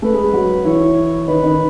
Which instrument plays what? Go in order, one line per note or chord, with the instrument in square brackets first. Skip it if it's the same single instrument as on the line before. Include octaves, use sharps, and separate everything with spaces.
[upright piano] A3 A4 [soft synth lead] B4
[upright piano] G#3 G#4
G#3 G#4
F#3 F#4
[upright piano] E3 E4 [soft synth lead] C#5
[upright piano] D#3 D#4 [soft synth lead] B4
[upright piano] D#3 D#4